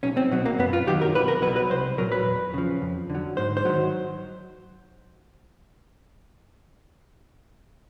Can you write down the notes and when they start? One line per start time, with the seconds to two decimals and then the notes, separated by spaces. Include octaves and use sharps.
0.03 B1 C#4
0.17 C4
0.32 B2 F#3
0.45 A#3
0.59 F#2 B3
0.73 F4
0.87 D#3 F#3 G4
1.01 A#4
1.15 B1 B4
1.28 A#4
1.42 F#3 B4
1.47 B2
1.56 B4
1.71 C2 C5
1.98 A#2 F#3 A#4
2.12 B4
2.26 E2
2.54 C#3 F3
2.82 F2
3.10 D3 F#3
3.37 G#2 C5
3.57 C5
3.65 D#3 F#3